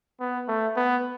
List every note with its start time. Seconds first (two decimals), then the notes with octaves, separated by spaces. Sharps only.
0.20 B3
0.48 A3
0.76 B3